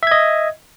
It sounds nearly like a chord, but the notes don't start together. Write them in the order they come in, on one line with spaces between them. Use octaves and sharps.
E5 G#6 D#5